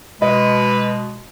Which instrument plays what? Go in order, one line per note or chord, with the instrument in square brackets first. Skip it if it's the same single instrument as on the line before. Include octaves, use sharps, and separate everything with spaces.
[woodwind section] B2 G#3 [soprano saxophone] B4 [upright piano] D#5